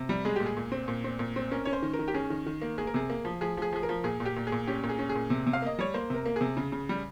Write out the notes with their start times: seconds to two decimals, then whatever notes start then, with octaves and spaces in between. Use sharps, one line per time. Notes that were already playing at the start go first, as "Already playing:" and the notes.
Already playing: C3
0.09 G3
0.25 G#3 G#4
0.36 A#2 G4
0.46 G#4
0.57 A#2
0.72 C4
0.88 A#2
1.04 C4
1.19 A#2
1.36 C4
1.51 C#4 A#4
1.65 C#4 C#5
1.73 C5
1.82 D#3
1.94 A#4
1.99 D#3
2.08 G4
2.14 C#4 G#4
2.30 D#3
2.46 D#3
2.62 A#3
2.78 A#3 G#4
2.87 A#4
2.94 C3 G#4
3.10 A#3
3.25 F3
3.41 F3 G#4
3.57 F3 G#4
3.73 F3 G#4
3.83 A#4
3.89 F3
4.04 A#2 G#4
4.20 A#2
4.25 G4
4.36 A#2
4.47 G#4
4.52 A#2
4.67 C#4 G4
4.83 A#2
4.89 G#4
4.99 C#4
5.09 G#4
5.15 A#2
5.30 C3
5.46 C3
5.53 F5
5.62 A#3 D#5
5.79 G3 C#5
5.94 A#3 C5
6.10 C3 A#4
6.26 A#3
6.36 C3 G#4
6.57 C#3
6.72 C#3
6.89 G3